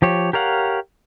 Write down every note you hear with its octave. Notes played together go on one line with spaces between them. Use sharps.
F3 G4 C#5
G4 A#4 C#5 F5 F#5